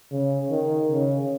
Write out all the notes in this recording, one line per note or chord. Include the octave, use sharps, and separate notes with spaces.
C#3
D#3
C#3